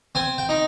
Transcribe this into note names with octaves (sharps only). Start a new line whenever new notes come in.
C4 G#5
G5
D#4